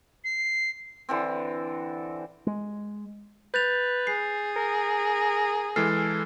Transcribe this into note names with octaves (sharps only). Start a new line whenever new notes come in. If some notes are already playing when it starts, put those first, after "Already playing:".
C7
D3 E3 C4
G#3
B4 G6 A6 F7
G#4 C7
A#4
E3 G#3 A4 F6 C7